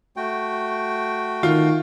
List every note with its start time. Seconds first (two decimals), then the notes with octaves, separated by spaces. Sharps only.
0.16 A3 F#4 G5
1.43 D#3 F4